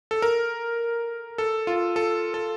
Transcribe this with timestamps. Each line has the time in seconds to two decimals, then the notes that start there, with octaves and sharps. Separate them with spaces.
0.11 A4
0.22 A#4
1.38 A4
1.67 F4
1.96 A4
2.34 A4